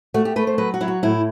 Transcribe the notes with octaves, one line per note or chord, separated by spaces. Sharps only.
A3 F#4
G4
A3 B4
C5
F#3 B4
F#4
F#3 E4
F#4
A2 E4